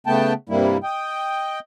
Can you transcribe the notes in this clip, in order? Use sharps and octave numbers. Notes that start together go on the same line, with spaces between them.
C#3 A3 B3 G5 A5
G2 C3 G3 A#3 E4
D#5 G5